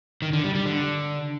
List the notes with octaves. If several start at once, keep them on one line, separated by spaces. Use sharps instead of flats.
D#3
D3
G3
G3
D3